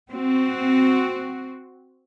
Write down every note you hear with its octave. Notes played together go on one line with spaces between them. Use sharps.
C4 F#4